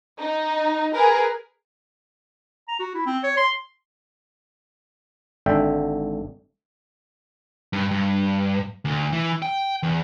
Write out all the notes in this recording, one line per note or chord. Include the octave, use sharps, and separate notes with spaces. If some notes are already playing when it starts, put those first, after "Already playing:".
D#4
G#4 A#4 B4
A#5
F#4
E4
C4
C#5
C6
G#1 D3 E5 G5
G2
G2
D2
E3
G5
E2